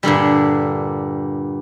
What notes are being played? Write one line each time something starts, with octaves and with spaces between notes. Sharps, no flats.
G2 A#2 D3 G3